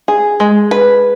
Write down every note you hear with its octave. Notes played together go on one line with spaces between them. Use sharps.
G#4
G#3
B4